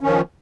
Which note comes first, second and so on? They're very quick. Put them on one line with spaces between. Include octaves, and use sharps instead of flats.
C#4 D#3 F3